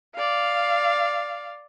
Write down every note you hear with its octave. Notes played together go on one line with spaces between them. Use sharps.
D5 F5